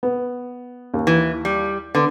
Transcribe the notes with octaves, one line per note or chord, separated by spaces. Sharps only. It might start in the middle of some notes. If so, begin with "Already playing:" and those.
B3
D#2
E3
G3
D3 B3